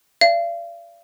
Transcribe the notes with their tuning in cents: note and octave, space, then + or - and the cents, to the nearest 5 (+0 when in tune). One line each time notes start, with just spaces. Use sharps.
D5 -15 F5 -40